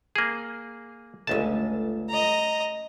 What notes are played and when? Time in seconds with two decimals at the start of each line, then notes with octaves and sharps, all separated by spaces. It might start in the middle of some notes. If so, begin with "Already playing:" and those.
0.16 A#3 G#4
1.27 G1 C#2 A3 C#4 A5
2.09 D#5 A#5